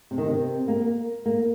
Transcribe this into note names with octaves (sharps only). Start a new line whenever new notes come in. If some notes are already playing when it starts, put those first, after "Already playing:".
C3
D#3
C3
A#3
A#3